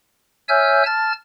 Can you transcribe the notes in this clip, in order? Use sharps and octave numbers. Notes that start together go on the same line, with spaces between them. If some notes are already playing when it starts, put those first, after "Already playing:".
C#5 E5 G#5 E6 F6 G6
A5 F6 A6